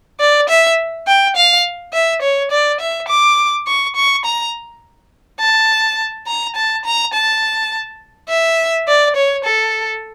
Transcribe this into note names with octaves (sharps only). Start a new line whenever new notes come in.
D5
E5
G5
F5
E5
C#5
D5
E5
D6
C#6
C#6
A#5
A5
A#5
A5
A#5
A5
E5
D5
C#5
A4